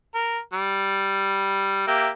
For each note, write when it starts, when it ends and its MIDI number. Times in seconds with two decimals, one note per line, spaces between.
0.15 0.39 70
0.53 1.86 55
1.87 2.09 58
1.87 2.09 67
1.87 2.09 76